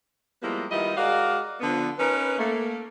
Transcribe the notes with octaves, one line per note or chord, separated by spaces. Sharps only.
F3 G3 G#3 A#3 B3 E4
D#3 G3 B3 E4 F4 D#5
G#3 F#4 A#4 D5 F5
D3 F3 B3
C#4 D#4 A#4 B4
A3 A#3